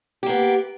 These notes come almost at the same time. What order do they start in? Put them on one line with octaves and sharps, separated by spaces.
G4 A#3 B3